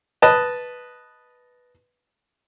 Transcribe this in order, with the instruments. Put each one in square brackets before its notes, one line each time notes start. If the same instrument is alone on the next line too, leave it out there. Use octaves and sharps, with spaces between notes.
[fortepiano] B4 D#5 A5